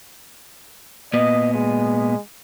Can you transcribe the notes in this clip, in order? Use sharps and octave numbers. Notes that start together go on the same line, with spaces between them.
A#2 B3 D#5
G#3